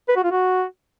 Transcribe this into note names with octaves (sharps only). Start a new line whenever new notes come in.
B4
F#4
F4
F#4